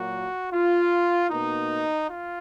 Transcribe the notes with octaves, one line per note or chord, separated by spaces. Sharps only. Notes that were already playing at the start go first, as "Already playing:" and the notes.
Already playing: A#2 F#3 A#3 F#4
F4
B2 A#3 D#4
F4